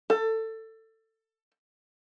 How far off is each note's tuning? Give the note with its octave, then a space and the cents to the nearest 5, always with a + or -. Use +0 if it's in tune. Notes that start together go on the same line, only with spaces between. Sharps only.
A4 +20